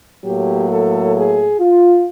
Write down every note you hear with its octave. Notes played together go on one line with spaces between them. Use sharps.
A2 F#3 A#3 G4
A4
G#4
F4